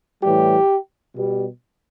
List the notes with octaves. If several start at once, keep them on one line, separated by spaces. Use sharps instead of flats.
A2 E3 G3 G4
B2 G3